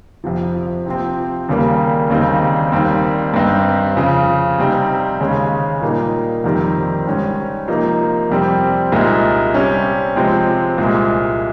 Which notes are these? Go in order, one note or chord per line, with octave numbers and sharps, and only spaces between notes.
F2 C3 F3
C3 F3 C4
D#2 C#3 G3 A#3
D#2 C#3 G3 C4 D#4
D#2 D#3 G3 C4
G2 G3 C4 D#4
F2 C#3 F3
C3 G3 C4 D#4
D#2 C#3 G#3 C#4
A#2 G3 A#3 D#4
F2 C3 D#3 G3 C4
G#2 G3 C#4
C3 F3 A#3 D#4
F2 C3 G3 C4
C2 A#2 G#3 D#4
C3 G3 C#4
C3 F3 G#3 C4
C2 A#2 G#3